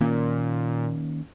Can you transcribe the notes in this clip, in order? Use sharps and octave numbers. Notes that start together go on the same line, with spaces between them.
A#2 D#3 A#3 C#4